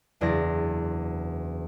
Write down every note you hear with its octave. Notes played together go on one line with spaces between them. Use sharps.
F#1 E2 D4 D5 A#6